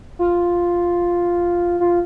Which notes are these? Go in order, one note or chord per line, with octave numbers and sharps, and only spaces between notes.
F4
F4